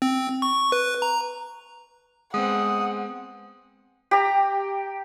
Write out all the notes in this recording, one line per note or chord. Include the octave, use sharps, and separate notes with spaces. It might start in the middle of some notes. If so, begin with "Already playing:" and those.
C4
C#6
B4
A#5
G#3 B3 C4 F#5 D#6
G4 A#5